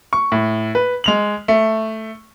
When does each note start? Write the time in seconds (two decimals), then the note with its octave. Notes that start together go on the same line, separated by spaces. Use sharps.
0.13 C#6
0.32 A2
0.75 B4
1.04 G#3 F7 F#7
1.48 A3